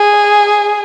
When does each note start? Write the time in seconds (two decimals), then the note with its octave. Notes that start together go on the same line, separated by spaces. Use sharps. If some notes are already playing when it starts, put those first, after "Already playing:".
Already playing: G#4